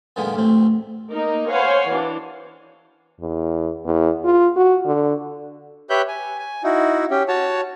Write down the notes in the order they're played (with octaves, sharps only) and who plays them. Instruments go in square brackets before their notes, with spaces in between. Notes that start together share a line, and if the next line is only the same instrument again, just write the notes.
[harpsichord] F#2 A#2 D3 D#3 G#3 B3
A1 D2 A2 C4
[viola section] A#3 D#4 A#4
C5 C#5 F5 F#5 G#5
E3 D4
[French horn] E2
E2
F4
F#4
D3
[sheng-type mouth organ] G4 B4 C#5 E5 F#6 G6
G#5
G#5
D#4 E4 F#4
C#4 G4
F#4 C#5 A5